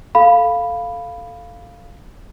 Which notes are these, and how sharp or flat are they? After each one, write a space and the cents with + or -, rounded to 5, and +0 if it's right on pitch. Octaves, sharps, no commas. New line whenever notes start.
A4 +0 F5 +0 B5 +0